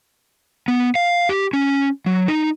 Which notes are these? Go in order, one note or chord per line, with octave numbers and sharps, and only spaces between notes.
B3
F5
G4
C#4
F#3
D#4